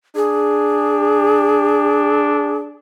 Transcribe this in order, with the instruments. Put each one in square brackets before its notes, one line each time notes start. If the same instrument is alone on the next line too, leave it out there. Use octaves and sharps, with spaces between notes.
[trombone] D4 [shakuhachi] G#4